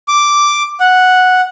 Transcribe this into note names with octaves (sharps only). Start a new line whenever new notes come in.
D6
F#5